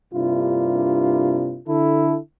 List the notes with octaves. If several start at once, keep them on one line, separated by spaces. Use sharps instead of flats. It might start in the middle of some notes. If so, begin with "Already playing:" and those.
G2 C3 A#3 D4 E4 F4
D3 E4 A4